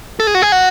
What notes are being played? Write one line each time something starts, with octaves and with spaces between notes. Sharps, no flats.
A4
G#4
F#4
G#4
F#4